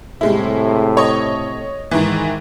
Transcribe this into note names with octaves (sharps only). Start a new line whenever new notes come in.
A2 C3 G3 G#3 E4
C#5 D#5
G#2 D#3 E3